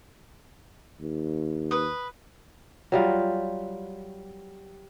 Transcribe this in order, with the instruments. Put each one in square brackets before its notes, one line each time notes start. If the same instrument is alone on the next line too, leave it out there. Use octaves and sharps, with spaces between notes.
[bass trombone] D#2
[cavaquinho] B4 D#6
[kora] F#3 G3 F4